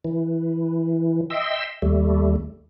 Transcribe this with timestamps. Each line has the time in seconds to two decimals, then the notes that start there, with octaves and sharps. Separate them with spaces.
0.04 E3
1.30 D#5 E5 G5 C6 E6
1.82 D#2 G3 A3